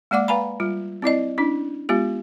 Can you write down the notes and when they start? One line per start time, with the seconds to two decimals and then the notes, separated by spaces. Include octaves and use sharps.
0.11 G#3 A#3 D5 F#5 D6
0.28 B4 F5 G#5 A#5 B5
0.60 G3 F4
1.02 C4 E4 D5 D#5
1.38 C#4 D4 E4
1.89 G#3 B3 F4 G4